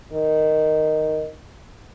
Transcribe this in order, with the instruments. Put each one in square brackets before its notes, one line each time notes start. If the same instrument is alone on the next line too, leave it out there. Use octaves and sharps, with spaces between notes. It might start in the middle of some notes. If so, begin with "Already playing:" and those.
[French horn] D#3